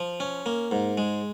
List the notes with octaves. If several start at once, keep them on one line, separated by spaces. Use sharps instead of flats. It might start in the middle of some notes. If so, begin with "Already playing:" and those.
Already playing: F3
C#4
A#3
G#2
G#3